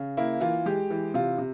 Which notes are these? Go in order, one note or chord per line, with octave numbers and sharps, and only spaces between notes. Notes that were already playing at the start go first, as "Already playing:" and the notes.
Already playing: C#3
A#3 E4
E3 F4
G#3 G4
E3
C3 F4
C3